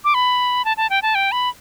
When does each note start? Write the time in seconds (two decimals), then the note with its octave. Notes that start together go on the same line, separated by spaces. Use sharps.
0.05 D6
0.14 B5
0.65 A5
0.77 A5
0.90 G5
1.02 A5
1.15 G5
1.32 B5